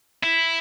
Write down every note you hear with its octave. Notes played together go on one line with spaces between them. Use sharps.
E4